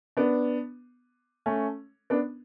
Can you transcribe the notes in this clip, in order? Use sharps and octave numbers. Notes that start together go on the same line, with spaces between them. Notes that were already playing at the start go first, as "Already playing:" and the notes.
B3 D4
A3 C#4
B3 D4